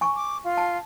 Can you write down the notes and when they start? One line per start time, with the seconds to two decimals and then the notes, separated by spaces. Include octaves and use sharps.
0.01 G#5 C#6
0.15 D6
0.44 F4
0.57 A5